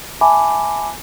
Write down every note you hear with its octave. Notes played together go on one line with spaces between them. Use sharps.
E5 G#5 A5 B5 D6